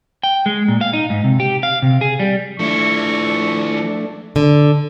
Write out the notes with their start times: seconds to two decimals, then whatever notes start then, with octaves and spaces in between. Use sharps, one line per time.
0.23 G5
0.46 G#3
0.68 A#2
0.81 F5
0.93 D#4
1.10 G#2
1.24 C3
1.40 G4
1.63 F5
1.82 C3
2.01 G#4
2.20 G3
2.59 F3 A3 D4 E4 C#6
4.36 D3